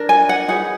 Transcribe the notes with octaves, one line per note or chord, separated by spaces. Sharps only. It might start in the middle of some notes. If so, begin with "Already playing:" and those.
Already playing: D4 A#4
G#5
F#5
D#4 G#4 B4 F#5